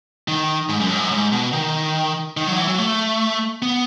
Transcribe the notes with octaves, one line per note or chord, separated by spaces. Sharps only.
D#3
G#2
F#2
G#2
F#2
G#2
B2
D#3
D#3
F#3
E3
F#3
A3
B3